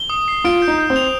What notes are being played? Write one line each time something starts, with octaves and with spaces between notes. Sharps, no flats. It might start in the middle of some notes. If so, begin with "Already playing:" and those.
Already playing: G7
D#6
C7
F4 D7
G6
D#4
G6
C4
F7